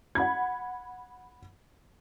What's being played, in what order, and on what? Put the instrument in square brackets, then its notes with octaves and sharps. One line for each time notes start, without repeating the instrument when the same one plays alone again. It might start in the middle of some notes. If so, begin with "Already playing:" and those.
[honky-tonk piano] F#5 B5 G#6